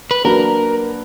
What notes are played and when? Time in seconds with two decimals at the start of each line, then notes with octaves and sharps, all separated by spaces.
0.11 B4
0.24 F#3 A#3 D4 F#4 A#4 B4